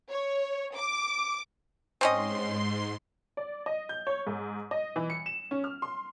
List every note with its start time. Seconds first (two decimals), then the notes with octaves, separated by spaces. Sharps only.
0.10 C#5
0.76 D6
2.01 G#2 C4 C#4 D#5 C6
3.37 D5
3.66 D#5
3.89 G6
4.07 C#5
4.27 G#2
4.71 D#5
4.96 E3
5.10 C#7
5.26 E7
5.51 C#4
5.64 F6
5.82 C6